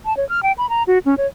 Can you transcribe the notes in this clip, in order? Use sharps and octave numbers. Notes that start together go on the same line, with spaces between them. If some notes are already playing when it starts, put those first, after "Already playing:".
A5
C#5
F6
G5
B5
A#5
F#4
C#4
C#5